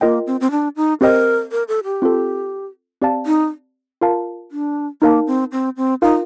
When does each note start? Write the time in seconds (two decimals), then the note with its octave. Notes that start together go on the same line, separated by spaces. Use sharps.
0.01 A#3 F4 A#4 D#5 G5
0.27 C4
0.41 C4
0.51 D4
0.76 D#4
1.01 C4 G4 A#4 C5 D#5 G5
1.52 A#4
1.68 A4
1.84 G4
2.02 C4 F4 A4
3.02 C4 G4 D5 F5 A5
3.26 D#4
4.01 F4 A#4 F5 A5
4.52 D4
5.02 A#3 D#4 A#4 F5 A5
5.27 C4
5.52 C4
5.77 C4
6.02 D#4 F4 A#4 F5